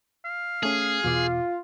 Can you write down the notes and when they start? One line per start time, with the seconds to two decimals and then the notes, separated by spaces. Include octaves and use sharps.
0.25 F5
0.63 A3 C#4 G#4
1.04 E2 B2 F4 D6